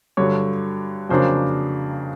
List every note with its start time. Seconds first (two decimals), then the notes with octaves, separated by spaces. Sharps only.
0.17 G2 D3 F#3 C#5
1.09 F2 C#3 F#3 A#3 D4 C5